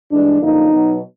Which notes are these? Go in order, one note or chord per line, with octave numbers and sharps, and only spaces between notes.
G2 E3 G#3 D4
F#2 D3 F3 A#3 D#4
B2 F#3 B3